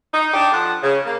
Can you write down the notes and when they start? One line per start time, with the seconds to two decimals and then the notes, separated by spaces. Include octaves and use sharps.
0.12 D#4
0.34 D4 D#4 G4
0.52 F3 A4 F#5
0.82 C#3
1.05 A#3